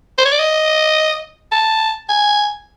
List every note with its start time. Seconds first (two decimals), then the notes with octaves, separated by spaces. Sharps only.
0.18 C5
0.25 C#5
0.32 D5
0.39 D#5
1.52 A5
2.09 G#5